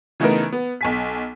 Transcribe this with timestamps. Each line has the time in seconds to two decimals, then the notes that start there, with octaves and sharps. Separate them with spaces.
0.20 C#3 E3 A3 B3 D#4 A#4
0.52 B3
0.81 B1 G#5 B6